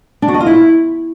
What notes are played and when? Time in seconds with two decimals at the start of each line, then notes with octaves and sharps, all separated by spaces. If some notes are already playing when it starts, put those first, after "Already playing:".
0.22 D4
0.28 F#4
0.34 D#5
0.40 F4
0.47 E4